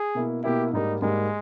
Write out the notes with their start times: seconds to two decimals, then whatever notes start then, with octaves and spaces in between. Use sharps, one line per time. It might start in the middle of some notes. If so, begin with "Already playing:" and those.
Already playing: G#4
0.15 B2 A#3 E4
0.44 B2 A#3 E4 G4
0.73 G#2 G3 A#3 D#4
1.02 G#2 G3 G#3 A#3